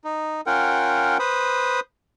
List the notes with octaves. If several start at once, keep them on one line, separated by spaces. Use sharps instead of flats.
D#4
C#4 F4 A#4 F#5 G5
B4 C5 B5 D#6